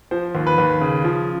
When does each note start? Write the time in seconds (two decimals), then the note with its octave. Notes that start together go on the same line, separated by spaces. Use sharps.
0.11 F3 C5
0.35 D#2
0.47 B4
0.58 D#2
0.81 C#3
1.04 F3